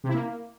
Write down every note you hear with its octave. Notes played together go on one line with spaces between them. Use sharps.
C3
E4
A#3